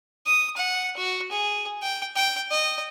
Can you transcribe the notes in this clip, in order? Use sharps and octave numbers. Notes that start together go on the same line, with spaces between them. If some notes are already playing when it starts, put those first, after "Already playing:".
D#6
F#5
F#4
G#4
G5
G5
D#5